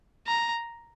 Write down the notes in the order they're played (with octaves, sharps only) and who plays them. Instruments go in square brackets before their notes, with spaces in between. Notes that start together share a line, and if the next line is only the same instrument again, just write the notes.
[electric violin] A#5